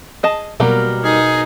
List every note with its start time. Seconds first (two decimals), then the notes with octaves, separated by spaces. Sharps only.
0.23 G#4 D#5 A5
0.60 B2 F#3 G3 A#3 A#4
1.04 D#4 G#4